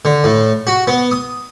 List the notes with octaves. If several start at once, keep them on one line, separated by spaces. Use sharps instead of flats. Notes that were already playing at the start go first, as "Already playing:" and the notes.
D3
A2
F#4
B3
D#6